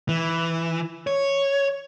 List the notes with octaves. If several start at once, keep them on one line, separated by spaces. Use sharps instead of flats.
E3
C#5